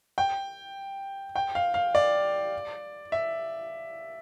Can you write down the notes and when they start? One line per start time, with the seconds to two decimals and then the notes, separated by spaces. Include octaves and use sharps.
0.18 G5
1.36 G5
1.55 F5
1.74 F5
1.95 D5
3.12 E5